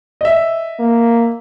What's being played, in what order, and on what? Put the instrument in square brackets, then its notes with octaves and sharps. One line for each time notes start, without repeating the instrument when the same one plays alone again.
[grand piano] D#5 E5
[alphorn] A#3